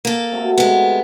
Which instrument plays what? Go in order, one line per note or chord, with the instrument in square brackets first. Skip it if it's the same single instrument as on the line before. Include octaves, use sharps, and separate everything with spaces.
[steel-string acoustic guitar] A#3 A4
[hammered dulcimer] C3 A3 F#4
[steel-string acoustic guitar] G#3 B3